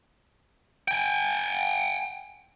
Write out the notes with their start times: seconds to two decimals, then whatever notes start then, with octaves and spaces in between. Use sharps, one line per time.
0.88 G5 G#5